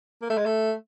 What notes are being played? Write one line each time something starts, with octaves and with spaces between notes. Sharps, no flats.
A#3
A3
G#3
A3